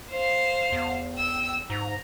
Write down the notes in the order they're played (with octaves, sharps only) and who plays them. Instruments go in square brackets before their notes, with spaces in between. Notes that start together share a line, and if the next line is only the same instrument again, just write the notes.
[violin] C5 F5
[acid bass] E2
[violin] G5 E6
[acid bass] G#2 [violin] A#5